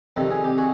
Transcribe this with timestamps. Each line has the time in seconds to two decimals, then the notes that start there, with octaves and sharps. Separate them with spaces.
0.16 F2 C3 D#3 G3 A4
0.31 G#4
0.44 G4
0.58 F#4 G#4